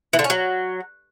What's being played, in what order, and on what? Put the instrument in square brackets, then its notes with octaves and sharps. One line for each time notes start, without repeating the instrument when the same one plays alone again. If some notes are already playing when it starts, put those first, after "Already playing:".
[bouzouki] E3
D3
C#4
F#3